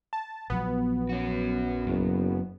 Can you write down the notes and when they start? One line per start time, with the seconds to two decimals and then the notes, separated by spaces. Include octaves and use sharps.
0.13 A5
0.50 A#1 F3 F#3 B3
1.09 C#4 F#4
1.86 F#1 F#2